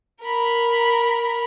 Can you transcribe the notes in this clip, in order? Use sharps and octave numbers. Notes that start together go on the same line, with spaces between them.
A#4 B5